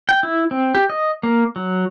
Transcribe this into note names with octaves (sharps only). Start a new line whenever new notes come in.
G5
E4
C4
G4
D#5
A#3
F#3